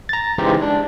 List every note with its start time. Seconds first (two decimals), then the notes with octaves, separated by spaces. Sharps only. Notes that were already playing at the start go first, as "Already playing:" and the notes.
0.09 A#5 A6
0.38 C#3 E3 G#3 D#4 G4 C5
0.62 D4